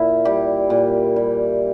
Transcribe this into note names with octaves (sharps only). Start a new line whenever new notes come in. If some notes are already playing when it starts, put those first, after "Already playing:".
Already playing: A#2 E4
G3 G4
A#2
G3